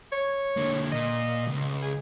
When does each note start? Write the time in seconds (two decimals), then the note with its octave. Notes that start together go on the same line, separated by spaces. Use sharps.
0.12 C#5
0.57 D3 A#3
0.92 A#2 D#5
1.47 C#2
1.82 G#4